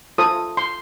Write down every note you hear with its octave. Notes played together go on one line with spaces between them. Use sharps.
F4 A4 C5 D#6
C6